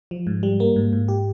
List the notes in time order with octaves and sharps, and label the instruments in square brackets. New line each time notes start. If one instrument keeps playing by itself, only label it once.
[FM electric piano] F3
G#2
G3
A#3
G#2
G#2
G4